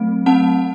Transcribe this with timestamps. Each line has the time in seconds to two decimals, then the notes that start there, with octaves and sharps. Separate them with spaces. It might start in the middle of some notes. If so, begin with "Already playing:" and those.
Already playing: F#3 A3 C4
0.26 C4 F#5 A5